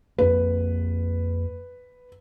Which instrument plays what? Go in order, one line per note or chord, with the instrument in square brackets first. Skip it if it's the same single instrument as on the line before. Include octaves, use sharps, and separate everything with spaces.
[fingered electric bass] F2 A#3 [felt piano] B4